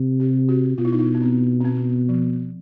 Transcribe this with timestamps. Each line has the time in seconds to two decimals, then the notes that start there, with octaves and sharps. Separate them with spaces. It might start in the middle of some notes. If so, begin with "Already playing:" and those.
Already playing: C3
0.20 G4
0.49 F#4
0.78 B2 F4
0.85 E4
0.92 D#4
0.99 E4
1.14 B3
1.22 C4
1.61 C4
1.65 B3
2.09 F3